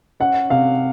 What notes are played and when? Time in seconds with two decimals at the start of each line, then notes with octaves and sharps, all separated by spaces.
0.20 C#4 F#5
0.50 C3 F5